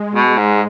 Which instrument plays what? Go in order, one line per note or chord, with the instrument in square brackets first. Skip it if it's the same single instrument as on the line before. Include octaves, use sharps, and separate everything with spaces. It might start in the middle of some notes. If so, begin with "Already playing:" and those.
Already playing: [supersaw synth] G#3
[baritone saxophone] B2
G#2